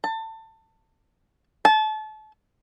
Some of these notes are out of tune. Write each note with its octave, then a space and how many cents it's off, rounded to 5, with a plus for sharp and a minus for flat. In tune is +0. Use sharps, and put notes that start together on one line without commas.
A5 +25
A5 -30